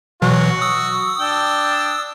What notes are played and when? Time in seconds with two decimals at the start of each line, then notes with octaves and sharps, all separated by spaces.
0.22 B2 E3 F#3 F#4
0.61 D#6 E6
1.20 D4 G5